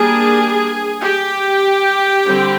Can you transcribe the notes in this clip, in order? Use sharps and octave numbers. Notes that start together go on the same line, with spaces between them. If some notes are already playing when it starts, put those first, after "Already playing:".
Already playing: G3 A#3 D4 G#4 G#5
G4 G5
D3 G3 C4